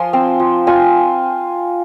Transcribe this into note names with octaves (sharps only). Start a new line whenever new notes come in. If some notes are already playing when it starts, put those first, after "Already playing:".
Already playing: F3 F4 G#5 C6
C4
F3
F4 G#5 C6